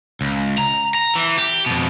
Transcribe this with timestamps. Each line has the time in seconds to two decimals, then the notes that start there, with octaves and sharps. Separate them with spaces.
0.21 C#2
0.58 A#5
0.95 A#5
1.15 E3
1.38 G4
1.66 F2 B2